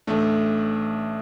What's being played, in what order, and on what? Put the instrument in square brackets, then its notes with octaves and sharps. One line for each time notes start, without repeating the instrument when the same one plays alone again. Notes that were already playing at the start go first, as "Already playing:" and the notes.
[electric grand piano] A1 A3 D4